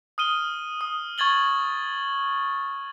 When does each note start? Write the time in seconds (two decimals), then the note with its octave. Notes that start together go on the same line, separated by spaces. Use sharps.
0.18 D#6 F6 D#7 G7
0.81 D#6
1.18 C#6 G#6 A6 F#7 G7